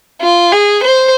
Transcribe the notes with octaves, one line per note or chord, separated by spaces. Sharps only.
F4
G#4
C5